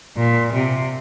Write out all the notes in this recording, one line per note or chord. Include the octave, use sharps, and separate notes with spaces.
A#2
C3